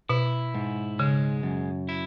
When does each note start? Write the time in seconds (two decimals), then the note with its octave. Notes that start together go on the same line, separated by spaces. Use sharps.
0.09 B2 E4
0.55 G#2
0.99 C#3 G#3
1.43 F#2
1.89 E4